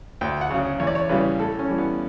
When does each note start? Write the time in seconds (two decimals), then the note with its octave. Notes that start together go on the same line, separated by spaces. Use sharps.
0.21 D2 G5
0.41 F#5
0.51 C#3 F#3
0.80 E2 C#5
0.87 D5
0.95 C#5
1.09 C#3 E3 G3 B4
1.39 A2 A4
1.59 C#4
1.68 E3 G3
1.78 B3